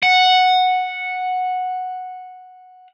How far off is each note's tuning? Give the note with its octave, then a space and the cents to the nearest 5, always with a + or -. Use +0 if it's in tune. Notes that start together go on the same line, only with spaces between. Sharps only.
F#5 -5